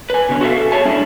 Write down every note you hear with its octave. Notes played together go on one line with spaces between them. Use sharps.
B4 G#5
B2 D3 B3 C#4
F#4 A4 C#5 E5 F5
A4
G#4 C#5 E5 A5
G#3 C#4 D4 E4 G#4 A4